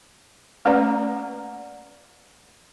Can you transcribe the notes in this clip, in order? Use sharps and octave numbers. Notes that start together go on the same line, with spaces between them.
A3 A#3 C#4 B4 D5 A#5